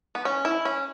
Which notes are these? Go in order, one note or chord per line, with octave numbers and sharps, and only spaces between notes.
B3
C#4
E4
C#4